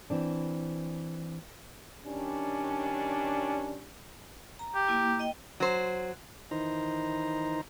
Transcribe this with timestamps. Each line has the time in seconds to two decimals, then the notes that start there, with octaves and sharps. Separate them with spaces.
0.10 E3 C4 D4
2.05 D#3 G3 C#4 D4
4.59 A#5
4.75 G4
4.88 A#3 E4
5.19 D#5 G5
5.60 F#3 C5
6.51 D#3 E3 D#4 C5 A#5